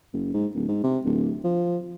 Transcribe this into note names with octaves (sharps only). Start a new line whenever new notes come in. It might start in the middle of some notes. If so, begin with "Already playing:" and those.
F#1
G#2
D1
G#2
C3
D1
F3